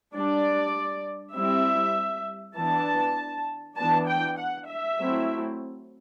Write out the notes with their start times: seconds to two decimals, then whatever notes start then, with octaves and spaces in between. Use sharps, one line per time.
0.14 G3 D4 D5
1.35 G3 C4 E4 E5
2.55 E3 B3 D4 A5
3.76 E3 B3 D4 A5
4.07 G5
4.37 F#5
4.67 E5
4.97 F#3 A3 C4 E4